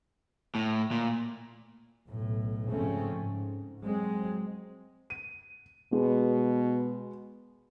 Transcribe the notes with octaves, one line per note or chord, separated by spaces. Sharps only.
A2
A#2
B1 A2
G#2 C#3 F3 A3 C4 C#4
G#2
F#3 G#3 C4
D#7
B2 G#3